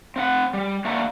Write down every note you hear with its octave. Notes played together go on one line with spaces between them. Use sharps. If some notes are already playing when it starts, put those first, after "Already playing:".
C4 F5 F#5
G3
A3 A#3 D4 F#4 E5 A#5